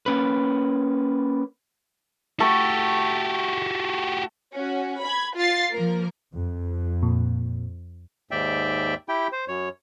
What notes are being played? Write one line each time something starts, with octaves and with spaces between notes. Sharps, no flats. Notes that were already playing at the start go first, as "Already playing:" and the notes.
A#3 C#4 B4
A3 F#4 G4 A4
C#4 F#4
B5 G#6
F4 A6 C7
F3 A#3 A#4
F2
A#2
D#2 G#2 D5 E5 G5
E4 G4 G5
C5
F#2 C#5